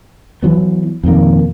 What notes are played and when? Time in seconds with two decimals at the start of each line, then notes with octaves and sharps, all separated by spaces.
0.43 E3 F#3 B3
1.04 F2 B2 D#3 A#3